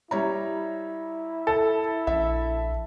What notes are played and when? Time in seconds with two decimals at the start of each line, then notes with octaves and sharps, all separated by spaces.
0.11 G3 E4 C#5 A#5
1.47 A4
2.07 A#1 E5